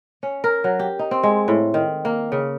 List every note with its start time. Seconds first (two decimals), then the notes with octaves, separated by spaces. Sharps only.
0.23 C#4
0.44 A#4
0.64 F#3
0.79 G4
0.99 D#4
1.11 C4
1.23 G#3
1.48 A2
1.74 D#3
2.05 A#3
2.32 C#3